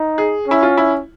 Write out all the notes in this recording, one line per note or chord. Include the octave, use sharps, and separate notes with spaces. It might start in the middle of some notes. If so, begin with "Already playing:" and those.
Already playing: D#4
G#4
C#4 E4
F4
E4